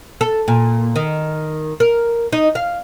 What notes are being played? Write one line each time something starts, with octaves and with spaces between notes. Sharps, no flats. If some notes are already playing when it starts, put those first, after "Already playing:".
A4
A#2
D#3
A#4
D#4
F5